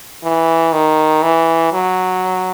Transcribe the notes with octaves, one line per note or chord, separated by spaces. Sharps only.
E3
D#3
E3
F#3